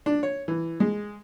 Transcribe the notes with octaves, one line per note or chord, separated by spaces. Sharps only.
D4
C#5
E3
G#3